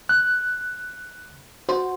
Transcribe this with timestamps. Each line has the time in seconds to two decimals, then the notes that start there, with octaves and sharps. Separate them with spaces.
0.09 F#6
1.69 F#4 C5